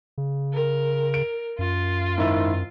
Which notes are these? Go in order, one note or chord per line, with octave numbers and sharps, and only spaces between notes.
C#3
A#4
D7
F#2 F4
G#2 D#3 E4